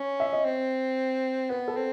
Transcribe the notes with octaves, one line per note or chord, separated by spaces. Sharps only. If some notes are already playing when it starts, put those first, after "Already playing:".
Already playing: C#4
E5
D#5
C4
B3 B4
A4
C4